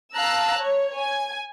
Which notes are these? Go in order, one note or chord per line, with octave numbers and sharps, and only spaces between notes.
F5 A5 A#5 E6 F#6
C#5
G#5